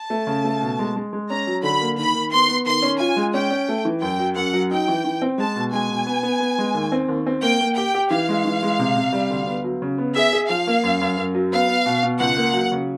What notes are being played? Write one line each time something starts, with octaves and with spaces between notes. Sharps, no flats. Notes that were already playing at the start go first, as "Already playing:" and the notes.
Already playing: A5
A3
C#3
A3
B2
G#3
G#3
G#3
C#4 A#5
F#3
D3 B5
A#3
D#3 B5
D#3
B3 C6
B3
D#3 C6
C#4
F4 G#5
G#3
C#4 G5
C#4
A3
E3
F#2 G5
F#3
F#2 F#5
F#3
D#4 G5
E3
E3
C4
G#3 A5
B2
G#3 G#5
B2
B3
B3
B3
G#3
D#2
C4
D#2
C4
A#3 G5
A#3
G4 G5
G4
E3 F5
G#3
E3
G#3
C3
C3
G3
D2
B3
F#3
C#3
B3
G#4 E5
G#4
F3 F5
A#3
F#2
F#2
F#2
F#3
B3 F5
B3
B2
B2
C#2 F#5
A#3
F#3
C#3